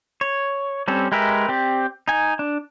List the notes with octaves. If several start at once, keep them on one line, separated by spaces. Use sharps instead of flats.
C#5
G3 C4 C#4 A4
G#3 G4 A#4 B4 E5
C4 G4 D5
D#4 G#5
D4